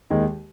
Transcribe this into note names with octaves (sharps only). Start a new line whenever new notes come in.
D#2 D#3 G#3